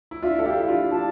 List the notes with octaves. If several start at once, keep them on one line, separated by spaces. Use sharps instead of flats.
E4
D4 F4 E5
A4
E4 G4 F5
D4 F4
D4 F4 A5